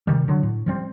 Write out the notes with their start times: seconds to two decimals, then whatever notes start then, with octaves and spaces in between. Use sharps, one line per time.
0.07 C3 D#3 G3
0.28 D3 F#3
0.43 A2
0.66 F3 G3 C4